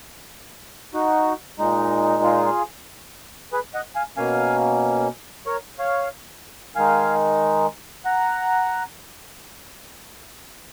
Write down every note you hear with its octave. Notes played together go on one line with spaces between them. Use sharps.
D#4 F#4
A#2 G#3 D#4
F4 G#4
G#4 B4
D#5 F#5
F5 G#5
B2 A#3 C#4 F5 G#5
A#4 C#5
C#5 F5
D#3 G#3 D#4 F5 G#5
F#5 A#5